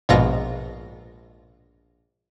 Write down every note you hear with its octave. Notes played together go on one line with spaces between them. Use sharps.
A#1 G#2 B2 F4 A#6